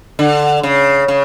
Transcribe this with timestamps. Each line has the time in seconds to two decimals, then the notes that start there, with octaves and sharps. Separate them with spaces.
0.19 D3
0.63 C#3
1.08 C#3